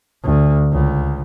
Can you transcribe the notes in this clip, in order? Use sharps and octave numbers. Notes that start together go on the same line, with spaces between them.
D2
C#2